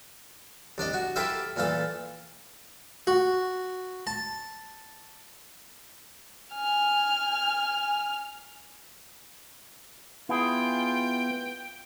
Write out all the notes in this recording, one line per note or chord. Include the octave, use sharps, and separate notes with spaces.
C2 D4 D5 D#5
F#4
E4 G4 A4 A#4 C5 E5
A#2 E3 F4 A4
F#4
A5
G#5 F6
B3 E4 F4 G#4 G5